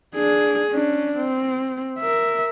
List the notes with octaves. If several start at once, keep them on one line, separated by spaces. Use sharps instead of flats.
D4 G#4
C#4 D4
C4
A#4 E5